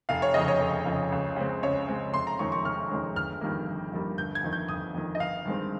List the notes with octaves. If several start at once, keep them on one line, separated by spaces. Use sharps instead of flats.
F1 F5
C#5
F2 C#3 D#5
C#5
F1
F2 C#3
C#2
C#3 G#3 C4
C#2 C#5
C#3 G#3 C4
F1 C6
A#5
F2 D#3 G#3 C#4 C#6
C#6
F1 F6
F2 D#3 G#3 C#4
G1 F6
F2 D#3 G3 A#3
G1
F2 D#3 G3 A#3
G1 G6
G#6
F2 D#3
G6
G1 D#6
F2 D#3
D#5
G1 F5
G2 D#3 G#3 C4